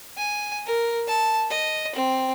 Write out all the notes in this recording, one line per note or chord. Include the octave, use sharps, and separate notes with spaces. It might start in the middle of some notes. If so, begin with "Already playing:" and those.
G#5
A#4
A5
D#5
C4